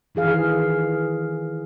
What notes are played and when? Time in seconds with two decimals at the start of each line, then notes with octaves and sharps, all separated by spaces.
0.15 D#3 E3 G#4 F5